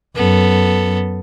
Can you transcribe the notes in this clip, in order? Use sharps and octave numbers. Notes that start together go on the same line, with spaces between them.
F#2 B3 A4